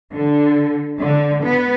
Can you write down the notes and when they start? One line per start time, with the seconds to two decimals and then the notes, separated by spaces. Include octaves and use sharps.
0.13 D3
1.00 D3
1.43 B3